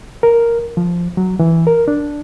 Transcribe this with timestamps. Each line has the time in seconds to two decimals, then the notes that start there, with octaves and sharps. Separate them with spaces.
0.23 A#4
0.77 F3
1.17 F#3
1.39 E3
1.67 A#4
1.88 D4